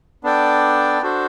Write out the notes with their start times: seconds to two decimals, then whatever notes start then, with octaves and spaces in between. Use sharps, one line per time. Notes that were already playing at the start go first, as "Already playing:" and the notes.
0.24 B3 D4 A4 D5 G5
1.02 D4 F#4 A4 C5